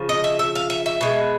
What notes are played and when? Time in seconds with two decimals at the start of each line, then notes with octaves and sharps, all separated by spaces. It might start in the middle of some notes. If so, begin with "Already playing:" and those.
Already playing: C#3 F3
0.09 D#5
0.24 E5
0.39 E5
0.55 F5
0.70 E5
0.86 E5
1.01 B2 G#3